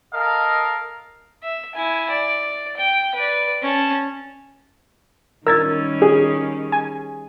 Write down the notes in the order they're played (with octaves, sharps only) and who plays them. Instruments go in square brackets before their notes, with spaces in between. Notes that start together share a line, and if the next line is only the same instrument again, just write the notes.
[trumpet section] A4 A#4 D#5 F5
[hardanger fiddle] E5
E4 G#5
D5
G5
B4 D5
C#4 A5
[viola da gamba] D#3 G3 C#4 [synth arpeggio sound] A#4 G#6 A6 [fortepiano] E6
[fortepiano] G#4
[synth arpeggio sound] G#5